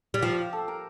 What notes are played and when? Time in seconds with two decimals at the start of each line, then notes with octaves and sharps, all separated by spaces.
0.14 G3
0.22 F3 G4
0.53 A4
0.68 A#4